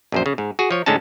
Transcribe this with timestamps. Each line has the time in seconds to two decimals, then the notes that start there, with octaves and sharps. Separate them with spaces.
0.12 A#1 F#2 C5
0.26 C#3
0.38 G#2
0.59 F#4 G#4
0.71 F3 C#5
0.86 A2 D3 G#3 C#4 D#4 A5